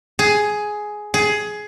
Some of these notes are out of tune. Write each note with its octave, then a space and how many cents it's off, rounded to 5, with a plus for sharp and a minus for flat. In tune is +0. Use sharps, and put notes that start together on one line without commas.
G#4 +10
G#4 +15